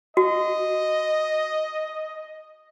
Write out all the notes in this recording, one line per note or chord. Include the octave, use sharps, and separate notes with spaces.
F#4 D#5